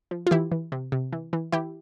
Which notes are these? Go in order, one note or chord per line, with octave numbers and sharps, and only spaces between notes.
F3
F4
E3 E4 G4
E3
C3
C3
E3
E3
E3 E4 G4